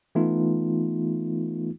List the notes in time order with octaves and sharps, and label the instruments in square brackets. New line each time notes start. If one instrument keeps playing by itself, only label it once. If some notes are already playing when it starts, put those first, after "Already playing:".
[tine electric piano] E3 A3 B3 D#4 F4